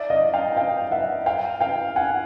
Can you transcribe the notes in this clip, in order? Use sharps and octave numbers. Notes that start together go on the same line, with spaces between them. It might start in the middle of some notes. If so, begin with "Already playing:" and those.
Already playing: D5 E5
D#5 F5
F5 G5
F5 G5
E5 F#5
F5 G5
F5 G5
F#5 G#5